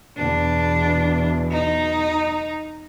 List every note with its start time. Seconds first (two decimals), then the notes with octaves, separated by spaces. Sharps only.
0.17 E2 B2 D4
1.51 D#4